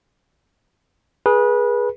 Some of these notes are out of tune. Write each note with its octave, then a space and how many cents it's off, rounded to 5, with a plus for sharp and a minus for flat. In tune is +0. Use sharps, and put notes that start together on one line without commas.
G#4 +0 B4 -25